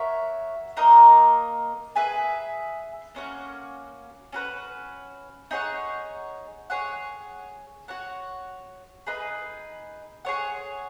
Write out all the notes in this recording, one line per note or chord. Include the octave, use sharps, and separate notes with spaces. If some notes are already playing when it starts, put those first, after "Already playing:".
Already playing: F#4 A#4 C#5 E5
A#3 D#4 A#4 D#5
G#4 B4 E5 G#5
A#3 C#4 F#4
C#4 F#4 B4
D#4 G#4 C#5 F#5
G#4 C#5 F#5
F#4 C#5 F#5
D#4 G#4 B4
G#4 C#5 F#5